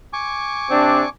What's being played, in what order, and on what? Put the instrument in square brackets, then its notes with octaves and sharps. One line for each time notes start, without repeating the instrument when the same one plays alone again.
[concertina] G#5 C#6 D6
[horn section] C3 C4 D4